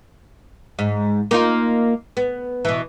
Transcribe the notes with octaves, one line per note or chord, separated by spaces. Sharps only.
G#2
A#3 D#4 F4
B3
B2 E3